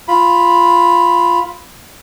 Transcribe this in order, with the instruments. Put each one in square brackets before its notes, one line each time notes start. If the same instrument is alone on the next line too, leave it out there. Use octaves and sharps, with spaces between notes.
[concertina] F4 B5